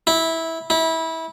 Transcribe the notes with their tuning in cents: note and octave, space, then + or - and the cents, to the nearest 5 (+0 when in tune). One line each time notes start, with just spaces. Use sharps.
E4 -15
E4 -25